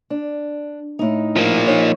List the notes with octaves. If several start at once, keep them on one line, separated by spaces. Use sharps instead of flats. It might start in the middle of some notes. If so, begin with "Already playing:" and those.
D4
A2 D#4
F3 A#3
D#4 C#5